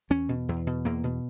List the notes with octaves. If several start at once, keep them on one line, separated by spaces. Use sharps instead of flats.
E2 C#4
B2
E2
B2
E2 A#3
B2